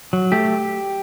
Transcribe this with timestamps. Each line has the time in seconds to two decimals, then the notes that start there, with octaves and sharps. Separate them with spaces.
0.13 F#3
0.32 A3 G4